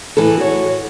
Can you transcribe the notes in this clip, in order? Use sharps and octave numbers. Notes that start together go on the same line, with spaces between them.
A2 E3 A4
F#4 C#5